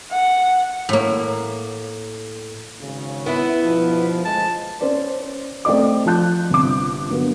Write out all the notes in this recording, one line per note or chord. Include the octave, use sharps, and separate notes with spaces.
F#5
A2 A#3
G#1 C#3
B3 E4 B4
G2 B2 F3
D2 F3 G#3 A5
C#4 C5 D5
A3 C4 D5 D#5 D6
F3 F4 A5 F#6 G6
G1 C3 D6
D3 F#3 A#3 B3